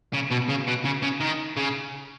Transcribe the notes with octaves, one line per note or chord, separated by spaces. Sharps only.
C#3
B2
C#3
B2
C#3
C#3
D#3
C#3